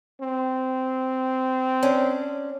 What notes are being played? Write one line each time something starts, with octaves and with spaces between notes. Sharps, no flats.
C4
C#4 D4